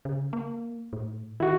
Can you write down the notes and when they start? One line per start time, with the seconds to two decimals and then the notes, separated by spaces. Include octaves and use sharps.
0.05 C#3
0.33 A#3
0.93 A2
1.40 D#3 E4 F#4